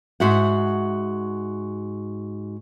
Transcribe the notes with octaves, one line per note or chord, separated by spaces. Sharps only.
G#2 F#4 E5 F#5